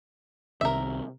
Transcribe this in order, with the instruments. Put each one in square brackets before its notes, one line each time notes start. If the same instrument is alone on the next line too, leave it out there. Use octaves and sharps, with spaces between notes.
[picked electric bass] C2 C3 D#3 [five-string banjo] A#4 E5